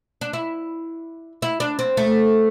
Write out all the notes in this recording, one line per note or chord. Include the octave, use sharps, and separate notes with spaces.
D4
E4
E4
D4
C4
A3